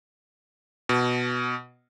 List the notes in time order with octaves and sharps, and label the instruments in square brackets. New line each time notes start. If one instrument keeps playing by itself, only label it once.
[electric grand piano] B2